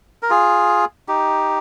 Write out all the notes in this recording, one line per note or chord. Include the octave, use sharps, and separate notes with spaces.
A#4
F4 G#4
D#4 G4